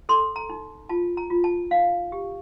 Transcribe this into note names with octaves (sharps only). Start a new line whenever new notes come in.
A4 C6
A#5
D#4
F4 A5
A#5
F4
A5
D#4 F5
G4